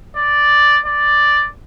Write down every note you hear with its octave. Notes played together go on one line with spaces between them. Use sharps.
D5
D5